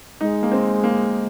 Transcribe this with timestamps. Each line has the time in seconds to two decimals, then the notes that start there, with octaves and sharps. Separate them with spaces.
0.21 G#3 D#4
0.43 A#3
0.52 C4
0.84 A#3